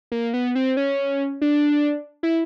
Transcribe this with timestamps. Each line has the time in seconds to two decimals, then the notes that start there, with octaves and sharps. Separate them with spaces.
0.12 A#3
0.34 B3
0.55 C4
0.77 C#4
1.41 D4
2.23 E4